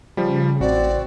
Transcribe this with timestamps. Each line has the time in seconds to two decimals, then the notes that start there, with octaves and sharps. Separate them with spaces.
0.17 C#3 F3 G3
0.61 A1 C4 F#4 D5